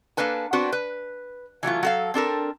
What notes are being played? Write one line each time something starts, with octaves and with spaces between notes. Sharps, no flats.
A#3 D4 A4 B4 G#5
B3 C4 D4 F#4 B4
B4
E3 F#3 A3 F4
F#3 A4 F5
C4 D4 A4 A#4